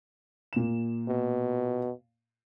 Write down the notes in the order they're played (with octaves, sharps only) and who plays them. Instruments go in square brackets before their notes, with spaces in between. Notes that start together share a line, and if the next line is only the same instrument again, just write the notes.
[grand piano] A#2 E7
[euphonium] B2